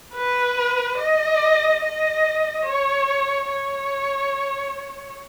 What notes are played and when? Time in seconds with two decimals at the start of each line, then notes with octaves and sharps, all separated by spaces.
0.14 B4
0.97 D#5
1.81 D#5
2.65 C#5
3.49 C#5